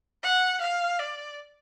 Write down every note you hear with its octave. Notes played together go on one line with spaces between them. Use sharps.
F#5
F5
D5